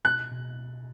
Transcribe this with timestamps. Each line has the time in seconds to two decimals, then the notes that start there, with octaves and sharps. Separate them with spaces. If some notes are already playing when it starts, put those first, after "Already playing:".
0.05 B2 F#6
0.31 B2